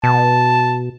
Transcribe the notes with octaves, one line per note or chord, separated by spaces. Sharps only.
B2 A5